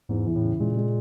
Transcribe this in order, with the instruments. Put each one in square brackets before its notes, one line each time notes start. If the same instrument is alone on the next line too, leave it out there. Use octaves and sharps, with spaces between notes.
[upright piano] E2 [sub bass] G#2
[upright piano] E3
[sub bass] A2
[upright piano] C#3
[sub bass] A#2 [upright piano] G#3
[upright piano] G#3